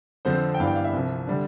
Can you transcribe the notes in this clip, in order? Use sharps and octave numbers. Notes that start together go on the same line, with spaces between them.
F2 D3 F3 C4 C5
G5
G2 E3 B3 D4 F5
G5
F5
E5
C2 C3 F3
D3 G3 D4